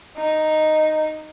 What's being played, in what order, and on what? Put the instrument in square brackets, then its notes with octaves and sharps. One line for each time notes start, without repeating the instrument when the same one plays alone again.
[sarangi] D#4